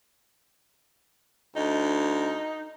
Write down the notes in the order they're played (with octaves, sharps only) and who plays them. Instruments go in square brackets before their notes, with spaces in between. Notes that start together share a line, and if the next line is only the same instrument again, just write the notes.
[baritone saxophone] D2 [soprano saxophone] D#4